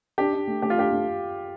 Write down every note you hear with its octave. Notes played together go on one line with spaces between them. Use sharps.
D4 G4
D4
A3
A3 G4
F4
D4 G4
A3